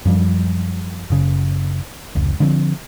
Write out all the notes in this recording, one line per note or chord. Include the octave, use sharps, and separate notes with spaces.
F#2 F3 G3
F#1 C#3
F1 C#2
D3 F3 G3 C4